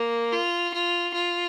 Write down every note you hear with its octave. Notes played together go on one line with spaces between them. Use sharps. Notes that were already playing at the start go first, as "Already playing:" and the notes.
Already playing: A#3
F4
F4
F4